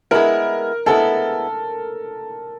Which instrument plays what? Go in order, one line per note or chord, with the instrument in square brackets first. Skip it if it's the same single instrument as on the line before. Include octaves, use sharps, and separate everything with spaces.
[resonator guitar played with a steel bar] G#3 B3 E4 [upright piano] A#4
[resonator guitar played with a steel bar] G#3 B3 E4 [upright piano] A4